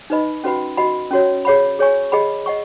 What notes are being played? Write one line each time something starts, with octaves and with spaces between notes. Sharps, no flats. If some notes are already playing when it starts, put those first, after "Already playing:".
D#4 B4 D#5 B5
C#4 F#4 B4 F#5 B5
F#4 D#5 F#5 B5
C#4 F#4 C#5
G#4 C#5 F#5 B5
G#4 C#5 G#5 C#6
G#4 D#5 F#5 B5
D#5 F#5 C#6